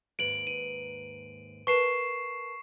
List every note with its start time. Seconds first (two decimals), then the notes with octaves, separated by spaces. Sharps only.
0.19 D#2 G#2 B4 D7 F#7
0.47 D#7
1.67 A#4 B4 A5 C#6 C7 E7